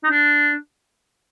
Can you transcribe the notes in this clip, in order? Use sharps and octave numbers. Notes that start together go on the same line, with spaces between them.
D#4
D4